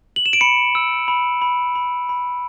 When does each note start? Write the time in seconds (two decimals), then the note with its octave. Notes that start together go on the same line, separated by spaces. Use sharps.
0.16 F#7
0.26 E7
0.33 D7
0.41 B5 C#7
0.75 E6
1.08 B5
1.42 B5
1.75 B5
2.09 B5